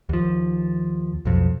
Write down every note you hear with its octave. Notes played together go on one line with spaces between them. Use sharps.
D#2 F3
B1 F2